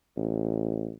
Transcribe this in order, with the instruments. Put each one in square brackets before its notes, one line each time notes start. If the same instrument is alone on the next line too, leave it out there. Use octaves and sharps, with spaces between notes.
[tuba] A1